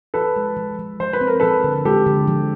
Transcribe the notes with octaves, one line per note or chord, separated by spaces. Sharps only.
F3 A4 B4
G#3
F3
F3
F3 C5
B4
C4
A#4
F3 A4 B4
D3
G#3 G4 A4
D3
F3